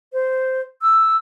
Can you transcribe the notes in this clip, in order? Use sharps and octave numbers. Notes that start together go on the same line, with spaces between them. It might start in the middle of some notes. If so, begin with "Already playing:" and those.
C5
E6